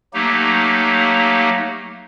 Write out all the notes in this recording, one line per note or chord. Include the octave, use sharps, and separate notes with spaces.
F#3 A3 A#3 D#4 G4